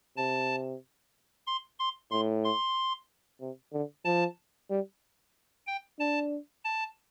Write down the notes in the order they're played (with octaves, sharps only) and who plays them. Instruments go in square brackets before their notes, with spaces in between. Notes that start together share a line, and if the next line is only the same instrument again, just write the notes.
[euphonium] C3 [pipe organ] A5
[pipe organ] C6
C6
[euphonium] A2 [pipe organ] C6
[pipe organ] C6
[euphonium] C3
D3
[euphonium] F3 [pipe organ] A5
[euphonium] G3
[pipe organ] G5
[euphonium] D4 [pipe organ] A5
[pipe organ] A5